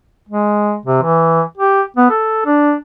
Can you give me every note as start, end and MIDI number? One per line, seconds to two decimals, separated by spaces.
0.29 0.76 56
0.86 1.01 48
1.03 1.42 52
1.58 1.82 67
1.97 2.09 59
2.10 2.44 69
2.46 2.74 62